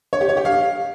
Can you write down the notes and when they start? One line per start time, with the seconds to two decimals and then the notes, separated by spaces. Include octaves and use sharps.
0.13 C#5
0.21 G4
0.29 C#5
0.37 G4
0.45 F5